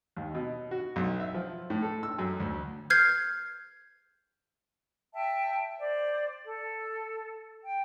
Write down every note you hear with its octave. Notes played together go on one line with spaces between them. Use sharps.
D#2
B2
F#4
B1
E5
F3
A2
A4
E6
F#2
D2
F6 G6 G#6 C7
E5 G5 A5
C5 D5
A4
G5